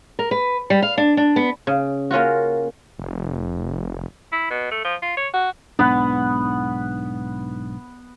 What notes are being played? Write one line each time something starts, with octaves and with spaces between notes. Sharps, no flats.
A#4
B4
G3
F5
D4
D4
B3
C#3
A#3 C#4 F4 F#4
F1
E4
B2
A3
F3
F4
C#5
F#4
B1 G#2 B3 D4 B4 F#5